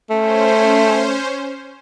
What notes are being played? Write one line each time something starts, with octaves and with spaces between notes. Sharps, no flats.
A3 C#4 C5